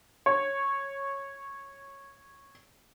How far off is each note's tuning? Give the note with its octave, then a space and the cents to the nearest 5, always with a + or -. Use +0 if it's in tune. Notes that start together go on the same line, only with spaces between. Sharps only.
C#5 -5